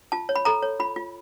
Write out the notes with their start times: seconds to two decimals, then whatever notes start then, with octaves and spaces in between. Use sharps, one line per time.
0.12 F4 A5
0.29 C#5
0.36 B5
0.45 A4 A#5
0.63 C#5
0.80 F4 B5
0.96 F4